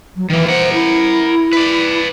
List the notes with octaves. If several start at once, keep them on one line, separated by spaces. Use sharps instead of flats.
F#3
D#3 E3 A#3
A#4 C5 F#5
E4
B4 D5